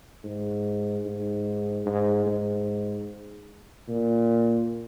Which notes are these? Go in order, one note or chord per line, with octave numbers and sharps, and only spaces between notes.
G#2
G#2
G#2
G#2
A#2